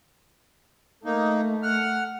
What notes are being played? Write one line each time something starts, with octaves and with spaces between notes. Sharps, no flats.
A3 A#3 D#4
F#5 F6